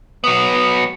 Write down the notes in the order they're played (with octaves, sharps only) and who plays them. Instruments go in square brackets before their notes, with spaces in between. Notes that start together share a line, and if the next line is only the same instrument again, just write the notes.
[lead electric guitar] F#3 B3